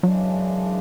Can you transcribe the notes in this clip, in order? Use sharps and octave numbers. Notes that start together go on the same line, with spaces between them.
F#2 C#3 E3 F#3 G#3 D4